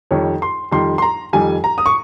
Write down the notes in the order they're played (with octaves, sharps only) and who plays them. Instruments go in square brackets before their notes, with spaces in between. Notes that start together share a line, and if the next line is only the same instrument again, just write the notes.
[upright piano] F2 D#3 G3 C#5
C6
F2 D#3 G3 C6
C6
A#5
F2 D#3 G3 G#5
A#5
D#6
C#6